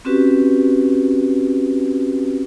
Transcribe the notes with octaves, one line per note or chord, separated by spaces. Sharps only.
C4 C#4 F#4 G4 B4